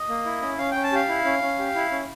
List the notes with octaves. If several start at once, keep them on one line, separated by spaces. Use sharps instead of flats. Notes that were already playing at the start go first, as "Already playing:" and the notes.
Already playing: D#5
A#3
E4
C#4
C#4 F5
C#4 G5
A5
G4 F5
E4
C#4
C#4
G4
E4
C#4